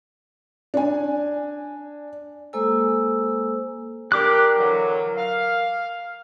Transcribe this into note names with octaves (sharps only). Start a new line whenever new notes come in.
D4 G#5
G#3 A#3 A4 C5 G#5 E6
D4 G4 A#4 D6 F#6
D3 E3 F#3
F5